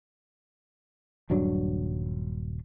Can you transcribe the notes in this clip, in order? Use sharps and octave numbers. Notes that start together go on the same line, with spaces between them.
D#1 G2 F#3 D4